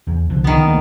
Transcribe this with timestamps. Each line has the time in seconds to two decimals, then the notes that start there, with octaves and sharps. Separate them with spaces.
0.07 E2
0.30 C2 D3 F3
0.44 D#3 B3
0.68 C#2 A3 A#3